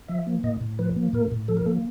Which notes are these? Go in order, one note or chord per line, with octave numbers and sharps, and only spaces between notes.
F3 E5
A#3
A2 D#5
A2
F3 B4
A#3
A2 A#4
A2
F3 A4
A#4
A#3 A4